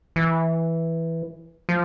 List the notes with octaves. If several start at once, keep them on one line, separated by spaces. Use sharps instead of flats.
E3
F3